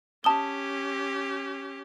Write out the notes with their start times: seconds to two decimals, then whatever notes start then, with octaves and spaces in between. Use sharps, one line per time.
0.24 C#4 G4 A5 D#6 G7